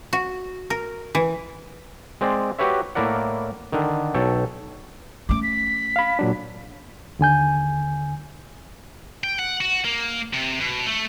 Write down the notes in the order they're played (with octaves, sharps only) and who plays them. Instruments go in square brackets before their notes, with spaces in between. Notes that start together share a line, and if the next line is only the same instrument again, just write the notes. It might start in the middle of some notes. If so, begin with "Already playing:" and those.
[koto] F#4
A#4
E3
[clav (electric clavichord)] G#3 C4 D5
F#4 G4 B4 C#5 E5
A2 A#3 E4 A#4 D5 F#5
D3 D#3
B1 A4 C#5 G5
[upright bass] A3 C#4 [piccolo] D6
[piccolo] B6
[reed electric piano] F5 B5
A#2 F#3 D4
D#2 D3 G#5 G6
[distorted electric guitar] G5
F#5
F#4
A#3
C3
B2
A3